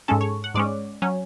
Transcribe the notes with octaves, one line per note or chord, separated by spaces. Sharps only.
G#2 G#3 C#4 A4
C#5
F#5
G#2 G#3 C#4 D5
F#3 C#4